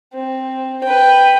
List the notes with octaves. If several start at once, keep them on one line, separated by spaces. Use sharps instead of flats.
C4
B4 G5